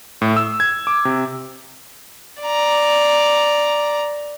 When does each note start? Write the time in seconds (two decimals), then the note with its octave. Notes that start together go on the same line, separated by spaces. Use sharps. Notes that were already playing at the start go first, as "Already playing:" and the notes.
0.22 A2
0.36 E6
0.60 G#6
0.87 D6
1.05 C3
2.41 D5 A#5